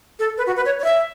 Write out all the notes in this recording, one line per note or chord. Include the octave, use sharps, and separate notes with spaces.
A4
B4
F#4
B4
C#5
C#5
E5